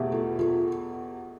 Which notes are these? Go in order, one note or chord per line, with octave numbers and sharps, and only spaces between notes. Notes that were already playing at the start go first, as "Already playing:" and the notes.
Already playing: E2 B2 A3 E4 G4
F4 A4
F4 A4